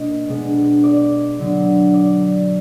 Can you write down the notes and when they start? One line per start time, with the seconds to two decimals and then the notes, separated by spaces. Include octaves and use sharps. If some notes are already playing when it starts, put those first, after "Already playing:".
Already playing: B2 A#3 D4 D#5
0.28 B2 G#3 B3 D4
0.84 D5
1.39 D3 F#3 B3 D4
1.94 D5